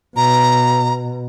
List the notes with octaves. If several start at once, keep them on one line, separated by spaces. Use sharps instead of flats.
B2 A#5